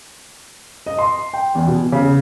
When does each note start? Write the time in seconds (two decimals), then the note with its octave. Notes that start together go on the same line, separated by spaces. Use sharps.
0.86 D#5
0.99 C6
1.33 G5
1.55 E2
1.67 B2
1.92 C#3